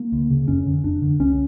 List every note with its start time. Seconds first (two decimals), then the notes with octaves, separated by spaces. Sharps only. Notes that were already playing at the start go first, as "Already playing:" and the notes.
Already playing: A#3
0.12 D2
0.30 C#3
0.48 F2 C#4
0.66 D3
0.84 F2 D4
1.01 D3
1.19 C#2 C#4